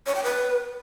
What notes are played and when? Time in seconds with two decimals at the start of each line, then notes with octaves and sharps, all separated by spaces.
0.06 C#5
0.15 G5
0.24 B4